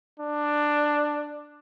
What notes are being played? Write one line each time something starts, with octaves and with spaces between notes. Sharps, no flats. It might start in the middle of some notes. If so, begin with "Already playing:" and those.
D4